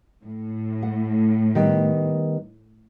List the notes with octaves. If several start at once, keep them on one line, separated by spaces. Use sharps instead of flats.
A2
F#5
D#3 G3 B3